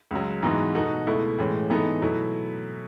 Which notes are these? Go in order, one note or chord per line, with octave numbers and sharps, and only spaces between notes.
C#2 C#3 F#3
G#2 E3 B3 D#4 F#4
B2 A3 D#4 F#4 A4
C#2 B2 A3 E4
A2 E3 G#3 C#4
G#2 E3 B3 D#4 A4
B2 F#3 A3 E4